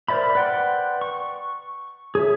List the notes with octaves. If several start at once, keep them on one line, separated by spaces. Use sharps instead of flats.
A#4 C5 D5 E5 B5
B4 D5 F#5 G5 C6
C#6
G#4 C#5 E5